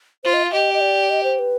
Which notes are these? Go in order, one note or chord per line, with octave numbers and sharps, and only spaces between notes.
F4 C5
D#5
F5
G4 D#5
D#5
D5
D#5
C5
B4